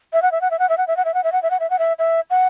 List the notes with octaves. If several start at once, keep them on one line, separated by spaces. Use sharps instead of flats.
E5
F#5
E5
F#5
E5
F#5
E5
F#5
E5
F#5
E5
F#5
E5
F#5
E5
F#5
E5
F#5
E5
E5
F#5